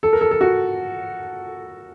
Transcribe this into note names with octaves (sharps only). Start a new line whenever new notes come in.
A4
A#4
A4
A4
F#4